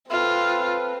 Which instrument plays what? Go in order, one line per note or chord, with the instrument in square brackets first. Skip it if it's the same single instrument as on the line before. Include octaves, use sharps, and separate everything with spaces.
[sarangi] C4 [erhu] F4 [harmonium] A4 B4